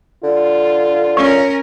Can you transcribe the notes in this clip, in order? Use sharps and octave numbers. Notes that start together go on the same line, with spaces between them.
D3 F4
C#4 A#4 C#5